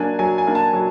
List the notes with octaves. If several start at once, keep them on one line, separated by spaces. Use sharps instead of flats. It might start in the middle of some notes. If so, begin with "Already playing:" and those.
Already playing: F#3 A#3 D4 G#5
F#3 G#5
G#5
A#3 D4
A5
F#3